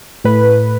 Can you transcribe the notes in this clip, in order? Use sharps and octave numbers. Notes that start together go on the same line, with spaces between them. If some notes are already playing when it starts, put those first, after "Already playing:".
A2 B4